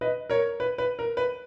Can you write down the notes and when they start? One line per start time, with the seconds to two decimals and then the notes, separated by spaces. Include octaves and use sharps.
0.01 B4 D#5
0.30 A#4 C#5
0.60 B4
0.78 B4
0.99 A#4
1.17 B4